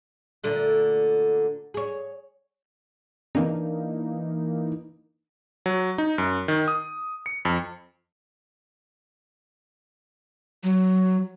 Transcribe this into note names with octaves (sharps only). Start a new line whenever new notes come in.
A#2 D3 A3
G#4 C#5
E3 A#3 D4 D#4
F#3
D#4
F#2
D#3
D#6
C#7
F2
F#3